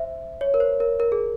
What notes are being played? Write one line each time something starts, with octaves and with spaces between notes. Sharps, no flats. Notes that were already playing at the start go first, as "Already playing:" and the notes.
Already playing: C5 E5
C#5
A#4
C5
A#4
A#4
G#4